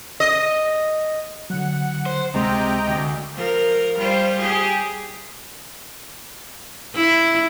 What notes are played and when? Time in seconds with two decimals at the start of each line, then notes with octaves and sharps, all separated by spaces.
0.20 D#5
1.50 D3 F#3 F#5
2.06 C5
2.35 C#2 C3 G#3 D#5 G5 A#5 C6
2.88 D2
3.36 F3 A#4
3.97 G3 F4 C5
4.39 G4 G#4
6.95 E4